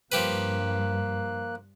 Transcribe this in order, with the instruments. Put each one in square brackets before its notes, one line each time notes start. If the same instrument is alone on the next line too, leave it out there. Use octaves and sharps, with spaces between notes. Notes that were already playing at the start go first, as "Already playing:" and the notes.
[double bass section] G2 [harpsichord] F3 G4 B4 [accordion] A#3 F#6